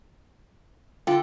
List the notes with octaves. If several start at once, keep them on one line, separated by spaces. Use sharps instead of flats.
D3 F4 G5